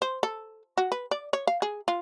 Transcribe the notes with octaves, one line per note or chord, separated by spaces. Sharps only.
C5
A4
F#4
B4
D5
C#5
F5
G#4
F4